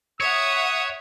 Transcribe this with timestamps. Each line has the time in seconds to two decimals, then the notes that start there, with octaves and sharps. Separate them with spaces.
0.20 C#5 E5 F#5 D#6